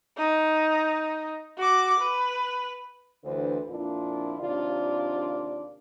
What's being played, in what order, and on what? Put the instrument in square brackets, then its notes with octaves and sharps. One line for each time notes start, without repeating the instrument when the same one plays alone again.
[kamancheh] D#4
F#4 D6
B4
[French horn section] D2 D3 E3 A4 B4 C5
F2 A#2 D4 E4 F4
D#2 C3 D4 F4 D5